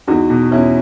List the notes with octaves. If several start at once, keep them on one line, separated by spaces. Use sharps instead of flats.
E2 D#4 F#4
B2
E2 C#4 E4